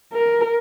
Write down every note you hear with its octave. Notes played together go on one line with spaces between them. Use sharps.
A#4